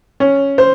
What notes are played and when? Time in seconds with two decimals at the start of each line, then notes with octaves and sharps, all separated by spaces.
0.20 C#4
0.58 C5